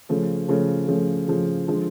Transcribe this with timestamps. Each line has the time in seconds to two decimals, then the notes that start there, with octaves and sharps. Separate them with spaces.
0.09 C#3 F3 A3
0.48 C#3 F3 A3
0.88 C#3 F3 A3
1.28 C#3 F3 A3
1.68 D3 F3 G#3